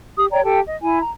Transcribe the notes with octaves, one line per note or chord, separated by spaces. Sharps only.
G4 D#6
C#5 D5 G5 A#5
G4 A4 G5 A5
D#5
E4 G#5
A#5